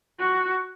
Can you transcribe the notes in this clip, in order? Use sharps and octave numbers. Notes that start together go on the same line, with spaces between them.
F#4